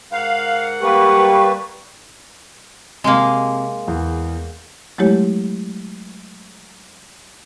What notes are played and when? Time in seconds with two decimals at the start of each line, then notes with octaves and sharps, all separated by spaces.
0.12 G#2 A#4 F5 F#5
0.82 G3 A#3 G4 B4 C#6
3.04 C3 G#3 A#3
3.88 E2
4.98 F#3 G#3 A3 E4 G4 C#5